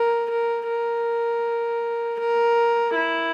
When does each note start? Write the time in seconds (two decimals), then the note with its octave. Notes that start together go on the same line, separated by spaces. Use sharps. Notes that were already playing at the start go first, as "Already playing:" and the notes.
Already playing: A#4
0.30 A#4
0.68 A#4
2.19 A#4
2.96 E4